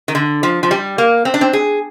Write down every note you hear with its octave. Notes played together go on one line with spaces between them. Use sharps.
D#3
D3
F3
F3
G3
A#3
C4
D4
C4
G#4